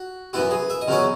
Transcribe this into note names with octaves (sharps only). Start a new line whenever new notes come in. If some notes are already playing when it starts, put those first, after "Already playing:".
Already playing: F#4
F#2 E3 B3 E4 F#4
G#4
E5
D#5
E2 C#3 F#3 C#4 E4 C#5